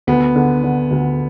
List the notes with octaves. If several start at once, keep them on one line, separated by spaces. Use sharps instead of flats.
D2 B3
D3
D3
D2